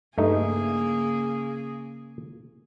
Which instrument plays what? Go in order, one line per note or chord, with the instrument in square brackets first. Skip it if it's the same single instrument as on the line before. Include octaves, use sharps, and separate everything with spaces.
[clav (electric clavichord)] G2 A3 D#4 [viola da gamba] C#3 A#3 G#4